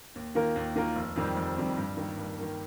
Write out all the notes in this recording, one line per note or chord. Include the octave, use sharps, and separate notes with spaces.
D#2
D#3 A#3 F4 A#4
D#2
D#3 A#3 F4 A#4
F1
F2 D#3 G3 C4
F1
F2 D#3 G3 C4
G2
D#3 A#3
G2
D#3 A#3